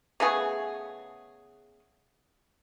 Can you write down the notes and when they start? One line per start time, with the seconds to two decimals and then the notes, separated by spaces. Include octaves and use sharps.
0.20 C#3 A3 B3 G#4